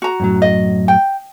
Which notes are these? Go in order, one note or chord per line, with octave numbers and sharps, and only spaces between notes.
F#4 A#5
F#2 A2 F#3
D#5
G5